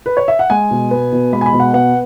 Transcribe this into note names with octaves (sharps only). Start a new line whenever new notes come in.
B4
C#5
E5
F#5
G#3 G#5
B2
B3
B2
G#3 B5
G#5
B5
B2
F#5
B3 F#5